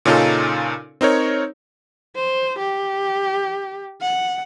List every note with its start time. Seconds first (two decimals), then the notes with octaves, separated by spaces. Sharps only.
0.05 A#2 C#3 C#4 D#4 F4 A4
1.01 C4 D#4 A#4 C#5
2.15 C5
2.59 G4
4.01 F#5